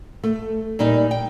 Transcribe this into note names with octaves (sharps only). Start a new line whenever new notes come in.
A3
A#2 G3 D#4
G5